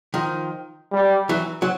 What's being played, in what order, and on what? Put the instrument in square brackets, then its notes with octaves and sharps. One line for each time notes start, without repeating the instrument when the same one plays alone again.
[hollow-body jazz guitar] D#3 F3
[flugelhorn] G3
[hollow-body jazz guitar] E3 F#3
F#3